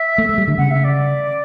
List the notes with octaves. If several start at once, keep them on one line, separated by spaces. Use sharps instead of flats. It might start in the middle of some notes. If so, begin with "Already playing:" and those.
Already playing: E5
A3
A3
G3
D3
C#3 F#5
E5
D5